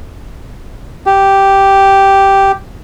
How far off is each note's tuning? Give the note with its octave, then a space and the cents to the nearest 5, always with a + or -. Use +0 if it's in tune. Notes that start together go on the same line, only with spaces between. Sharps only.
G4 -5